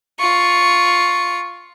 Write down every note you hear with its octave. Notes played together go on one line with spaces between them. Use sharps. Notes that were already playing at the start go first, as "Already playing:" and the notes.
F4 C#6